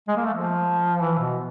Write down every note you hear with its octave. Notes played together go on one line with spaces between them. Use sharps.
G#3
A#3
A3
F3
E3
B2